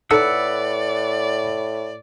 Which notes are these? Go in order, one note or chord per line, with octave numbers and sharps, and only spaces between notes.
A2 D#4 A4 B4 D5 F#5 E6